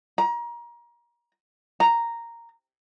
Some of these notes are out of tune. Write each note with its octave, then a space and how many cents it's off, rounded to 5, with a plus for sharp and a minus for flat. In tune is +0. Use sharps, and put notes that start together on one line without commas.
A#5 +30
A#5 -5